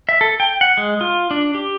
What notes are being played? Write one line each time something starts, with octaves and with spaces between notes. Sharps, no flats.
E5
A4
G5
F#5
G#3
F4
D4
G4